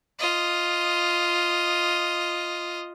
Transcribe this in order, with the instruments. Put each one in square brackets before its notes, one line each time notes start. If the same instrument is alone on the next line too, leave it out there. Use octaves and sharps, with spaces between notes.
[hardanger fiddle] F4 D#5